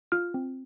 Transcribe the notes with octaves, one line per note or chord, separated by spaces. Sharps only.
F4 F6
C4